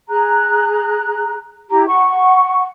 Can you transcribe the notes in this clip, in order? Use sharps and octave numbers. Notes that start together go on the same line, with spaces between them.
G#4 A#5 F#6
E4 G4 A#5
F#5 C#6